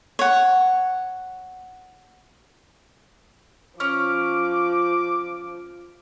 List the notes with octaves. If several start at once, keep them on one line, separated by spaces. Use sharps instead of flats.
C#5 F#5
F3 C#4 D6 F6